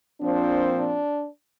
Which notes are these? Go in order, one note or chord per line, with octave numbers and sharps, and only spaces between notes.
A#2 F3 C4 D4
D4